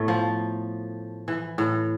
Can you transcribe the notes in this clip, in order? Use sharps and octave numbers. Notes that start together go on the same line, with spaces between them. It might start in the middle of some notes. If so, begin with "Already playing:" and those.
Already playing: A2 A3 B3
F3
E3
A2